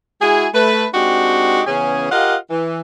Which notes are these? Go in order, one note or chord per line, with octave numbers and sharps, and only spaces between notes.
G#3 E4 F#4 G#4
A3 B4
G#3 C4 D4 D#4 F#4 G4
C#3 E3 B3 C#4 G#4
F4 G4 A#4 D#5 F5 F#5
E3